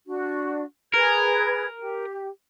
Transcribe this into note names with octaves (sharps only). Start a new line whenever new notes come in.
D4 F#4
G#4 A#4 B4 G#6
G4